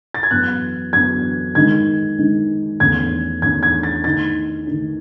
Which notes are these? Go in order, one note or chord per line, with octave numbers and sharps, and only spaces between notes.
A6
G#6
F#2 E3 B3 F#6
F#2 E3 B3 G#6
D#3 G#3 D#4 G#6
D#3 G#3 D#4
E2 D#3 A3 C#4 G#6
E2 D#3 A3 C#4 G#6
G#6
A6
D#3 A3 D#4 A6
D#3 A3 D#4